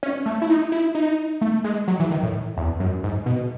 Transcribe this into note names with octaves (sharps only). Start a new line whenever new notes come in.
C#4
A3
E4
D#4
E4
D#4
A3
G#3
F#3
E3
D#3
A2
E2
F#2
G#2
B2